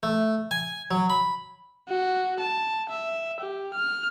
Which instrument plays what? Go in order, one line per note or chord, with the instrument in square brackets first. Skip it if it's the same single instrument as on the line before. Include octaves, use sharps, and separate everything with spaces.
[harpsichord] A3
G#5
F#3
B5
[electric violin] F#4
A5
E5
G4
F6